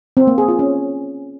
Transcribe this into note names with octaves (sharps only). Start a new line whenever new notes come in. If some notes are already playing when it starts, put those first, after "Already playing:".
C4
A#3
G#4
F4
C#4